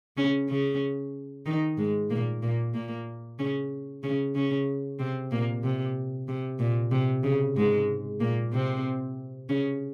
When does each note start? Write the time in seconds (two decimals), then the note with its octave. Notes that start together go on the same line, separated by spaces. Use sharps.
0.17 C#3 C#4
0.49 C#3 C#4
1.46 D#3 D#4
1.77 G#2 G#3
2.10 A#2 A#3
2.42 A#2 A#3
2.74 A#2 A#3
3.39 C#3 C#4
4.03 C#3 C#4
4.35 C#3 C#4
4.99 C3 C4
5.31 A#2 A#3
5.64 C3
6.28 C3
6.59 A#2
6.92 C3
7.24 C#3
7.56 G#2 G#3
8.20 A#2 A#3
8.53 C3 C4
9.49 C#3 C#4